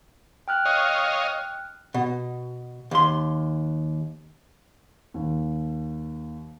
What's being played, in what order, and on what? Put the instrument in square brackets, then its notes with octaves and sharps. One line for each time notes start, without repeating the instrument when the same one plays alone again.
[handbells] G5 F6 F#6
[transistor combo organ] C#5 D#5 F5
[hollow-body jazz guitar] B2
D#2 C6
[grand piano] D#2